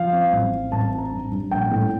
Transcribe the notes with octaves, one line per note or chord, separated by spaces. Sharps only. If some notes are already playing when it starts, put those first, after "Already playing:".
Already playing: F3 F5
C4
A1
C4
A1 A5
C4
A#5
G2
G2
A#1 G5
A2